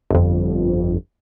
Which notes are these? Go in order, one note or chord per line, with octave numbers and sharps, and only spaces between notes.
G1 F2